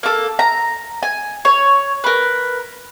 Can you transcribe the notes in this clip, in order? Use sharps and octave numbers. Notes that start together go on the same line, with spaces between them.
A#3 A4
A#5
G#5
C#5
A#4 B4